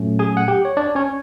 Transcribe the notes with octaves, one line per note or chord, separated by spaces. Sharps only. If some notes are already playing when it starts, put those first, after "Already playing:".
Already playing: A#2 F#3 A3 C#4
G#4 G#5
F#5
G4 G5
C#5
D4 D5
C#4 C#5